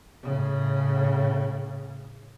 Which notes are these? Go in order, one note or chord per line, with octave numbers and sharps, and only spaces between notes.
A2 C#3